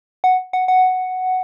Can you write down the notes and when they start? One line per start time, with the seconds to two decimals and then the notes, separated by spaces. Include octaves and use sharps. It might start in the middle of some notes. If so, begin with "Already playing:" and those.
0.24 F#5
0.53 F#5
0.68 F#5